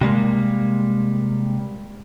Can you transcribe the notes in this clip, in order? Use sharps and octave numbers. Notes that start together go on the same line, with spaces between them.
C3 G3 G#3 A#3